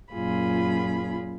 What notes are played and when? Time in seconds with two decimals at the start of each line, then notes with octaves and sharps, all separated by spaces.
0.13 F#2 A#2 F4 G#4 B5